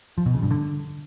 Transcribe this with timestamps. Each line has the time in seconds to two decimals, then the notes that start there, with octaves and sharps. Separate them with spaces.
0.18 F3
0.26 B2
0.34 C#3
0.42 G2
0.51 D3